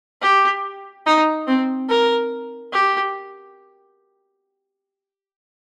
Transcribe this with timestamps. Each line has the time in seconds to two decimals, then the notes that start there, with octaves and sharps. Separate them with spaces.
0.21 G4
1.06 D#4
1.47 C4
1.89 A#4
2.73 G4